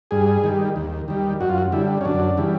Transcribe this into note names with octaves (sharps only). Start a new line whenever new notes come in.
G2 G#4
D#3 G3
D#2
D#3 G3
F#2 F#4
F4
F#4
D3 G3 E4
C#4
F#2 D4
C#3 E3 G3